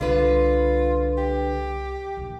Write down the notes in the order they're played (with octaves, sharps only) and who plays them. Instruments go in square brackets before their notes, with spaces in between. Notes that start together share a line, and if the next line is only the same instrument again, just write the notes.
[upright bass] C2 [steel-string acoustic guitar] D3 B4 [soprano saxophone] F4
[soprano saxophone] G4
[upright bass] A#1 D#2